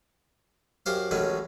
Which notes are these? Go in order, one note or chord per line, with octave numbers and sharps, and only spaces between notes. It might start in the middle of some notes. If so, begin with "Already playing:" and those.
F#2 G4 C5 F5
A1 D#3 F#3 G#3 C#4